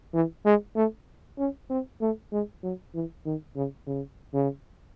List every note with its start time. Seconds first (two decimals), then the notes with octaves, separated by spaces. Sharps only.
0.14 E3
0.45 G#3
0.76 A3
1.38 C#4
1.70 C4
2.01 A3
2.32 G#3
2.63 F#3
2.94 E3
3.25 D#3
3.56 C#3
3.87 C#3
4.34 C#3